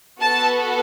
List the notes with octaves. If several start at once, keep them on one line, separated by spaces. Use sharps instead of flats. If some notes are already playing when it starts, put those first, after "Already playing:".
B3 F#4 A4 A5